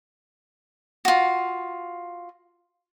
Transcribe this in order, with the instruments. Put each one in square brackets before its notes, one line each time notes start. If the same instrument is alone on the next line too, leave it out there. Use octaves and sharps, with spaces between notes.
[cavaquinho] F4 F#4